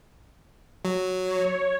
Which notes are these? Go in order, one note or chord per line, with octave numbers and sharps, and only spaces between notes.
F#3
C#5